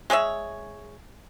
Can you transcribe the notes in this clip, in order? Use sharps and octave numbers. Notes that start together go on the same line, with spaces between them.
G#3 G#4 C#5 E5